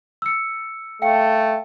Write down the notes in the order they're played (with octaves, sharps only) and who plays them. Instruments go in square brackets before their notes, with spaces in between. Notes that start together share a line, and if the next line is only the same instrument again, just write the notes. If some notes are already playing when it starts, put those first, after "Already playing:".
[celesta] E6 C#7
[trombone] A3 [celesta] F5 G5 C#7